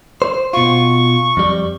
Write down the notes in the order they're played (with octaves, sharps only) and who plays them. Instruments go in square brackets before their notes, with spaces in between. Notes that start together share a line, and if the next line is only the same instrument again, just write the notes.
[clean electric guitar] C5
[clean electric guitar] B2 F4 [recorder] C#6
[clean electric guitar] F2 G3